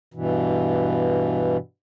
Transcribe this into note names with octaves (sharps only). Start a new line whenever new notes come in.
G2 B2 E3